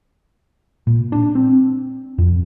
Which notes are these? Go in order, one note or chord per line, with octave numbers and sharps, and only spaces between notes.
A#2
D4
C4
F2